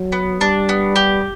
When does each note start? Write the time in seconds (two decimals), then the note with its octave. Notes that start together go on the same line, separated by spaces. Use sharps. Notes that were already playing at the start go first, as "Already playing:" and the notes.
Already playing: F#3
0.12 B3
0.40 G3 D4
0.69 B3
0.96 G4